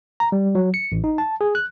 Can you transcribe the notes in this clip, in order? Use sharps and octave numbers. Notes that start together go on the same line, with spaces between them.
A#5
G3
F#3
C#7
A1
D#4
A5
G#4
F#6